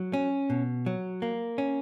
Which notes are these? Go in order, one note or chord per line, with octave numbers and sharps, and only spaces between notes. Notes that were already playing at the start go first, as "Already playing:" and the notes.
Already playing: F#3
C#4
B2
F#3
A#3
C#4